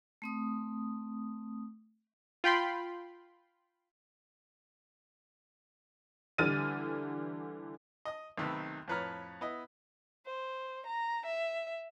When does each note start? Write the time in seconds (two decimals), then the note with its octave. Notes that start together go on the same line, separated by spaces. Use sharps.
0.22 A3 C4 D#6
2.44 F4 G5 B5 C6
6.38 D3 E3 G3 F6 A6 D#7
8.05 D#5 D#6
8.38 B1 C3 D#3 A3 B4 E6
8.88 F2 A2 B4 C#5 A#5 F6
9.41 B3 E4 D#5
10.26 C5
10.86 A#5
11.26 E5